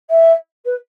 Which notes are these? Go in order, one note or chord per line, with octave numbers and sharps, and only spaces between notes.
E5
B4